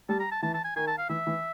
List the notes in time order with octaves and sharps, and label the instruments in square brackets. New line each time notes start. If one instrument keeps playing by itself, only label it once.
[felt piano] G3 [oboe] A5
[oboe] A#5
A5
[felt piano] E3 [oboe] A5
[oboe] A5
G#5
[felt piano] D#3 [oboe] G#5
[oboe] A5
F5
[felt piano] E3 [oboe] E5
[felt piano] E3